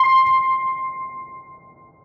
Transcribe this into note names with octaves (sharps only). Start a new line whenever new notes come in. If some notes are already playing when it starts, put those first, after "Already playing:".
Already playing: C6